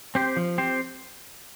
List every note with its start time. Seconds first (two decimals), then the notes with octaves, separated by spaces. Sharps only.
0.15 C4 G4 C5
0.37 F3
0.58 C4 G4 C5